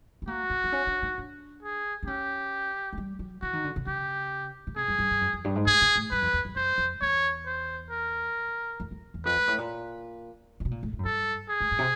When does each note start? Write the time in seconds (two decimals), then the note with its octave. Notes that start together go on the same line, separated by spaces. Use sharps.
0.22 B3
0.27 A#3 F#4
0.50 C4
0.64 C4
0.72 C#4
0.87 D4
1.02 D#4
1.18 D4
1.63 G#4
2.03 D4
2.07 C#4 G4
2.93 G#3
2.98 G3
3.19 F#3
3.42 E3 F#4
3.53 D#3
3.64 D3
3.76 C#3
3.87 C#3 G4
4.67 C#3
4.76 C3 G#4
4.88 G2
4.99 G2
5.11 G2
5.21 F#2
5.33 F2
5.44 G2
5.55 G#2
5.66 A2 G#4
5.81 A#2
5.96 A2
6.11 G2 B4
6.22 F2
6.33 E2
6.45 F#2
6.56 F#2 C5
6.78 F2
7.01 E2 C#5
7.46 C5
7.90 A#4
8.80 F2
8.91 F2
9.14 E2
9.25 F2 B4
9.37 G#2
9.48 A2
9.58 A#2
10.60 A#2
10.65 B2
10.71 A#2
10.83 A2
10.93 A2
10.99 F#2
11.05 G2 A4
11.49 G#4
11.60 A2
11.71 A2
11.79 C3